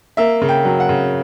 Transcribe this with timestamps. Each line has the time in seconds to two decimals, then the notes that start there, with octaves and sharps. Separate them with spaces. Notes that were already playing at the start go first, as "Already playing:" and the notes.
0.17 A#3 E5
0.42 C#3
0.49 G5
0.65 F#3
0.80 F#5
0.89 C#3